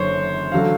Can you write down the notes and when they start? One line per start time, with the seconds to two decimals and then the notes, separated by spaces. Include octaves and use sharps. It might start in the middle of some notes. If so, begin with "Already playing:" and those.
Already playing: F#1 F#2 D3 C5 C#5
0.52 D3 F#3 A3 F5